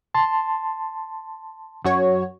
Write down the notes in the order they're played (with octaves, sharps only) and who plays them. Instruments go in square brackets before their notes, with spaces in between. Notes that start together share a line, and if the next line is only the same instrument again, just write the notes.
[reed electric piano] A5 C6
[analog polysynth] F#2 F#4 C#5